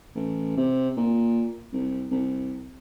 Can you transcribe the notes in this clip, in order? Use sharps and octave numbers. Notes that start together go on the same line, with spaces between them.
A1
C3
A#2
C2
C2